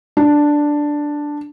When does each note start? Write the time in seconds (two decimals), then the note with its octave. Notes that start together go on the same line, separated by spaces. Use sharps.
0.17 D4